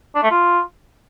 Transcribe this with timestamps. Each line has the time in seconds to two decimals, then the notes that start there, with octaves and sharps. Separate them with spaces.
0.15 D4
0.23 A3
0.31 F4